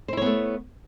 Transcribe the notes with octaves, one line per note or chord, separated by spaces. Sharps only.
A3 B3 E4 C5 C#5